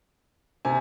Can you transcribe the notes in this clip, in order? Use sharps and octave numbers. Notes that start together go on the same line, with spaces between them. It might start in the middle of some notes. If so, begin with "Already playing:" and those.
C3 G#5